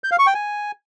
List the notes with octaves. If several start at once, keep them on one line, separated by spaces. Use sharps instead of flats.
G6
F5
C#6
G5
G#5